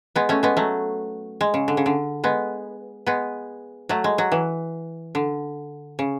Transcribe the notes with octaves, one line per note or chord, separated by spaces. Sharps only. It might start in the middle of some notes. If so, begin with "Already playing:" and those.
G#3 B3
A3 C#4
G#3 B3
F#3 A3
G#3
C#3
D3
C#3
D3
G#3 B3
G#3 B3
F#3 A3
G#3
F#3
E3
D3
C#3